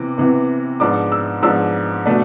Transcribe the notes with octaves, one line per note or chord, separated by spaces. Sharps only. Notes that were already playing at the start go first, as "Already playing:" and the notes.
Already playing: C3 E3 B3 D6
C3 E3 B3
G#2 F3 B3 D4 D6
E6
G#2 F3 B3 D4 E6
B2 A3 D4